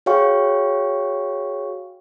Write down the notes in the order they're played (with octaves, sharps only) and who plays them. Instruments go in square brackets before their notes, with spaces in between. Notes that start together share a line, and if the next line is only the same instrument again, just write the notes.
[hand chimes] F#4 G#4 C#5 F5 G5 C#6